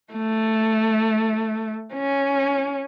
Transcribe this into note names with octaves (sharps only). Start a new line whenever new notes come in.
A3
C#4